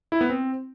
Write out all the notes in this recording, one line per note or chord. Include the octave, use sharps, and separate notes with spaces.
E4
B3
C4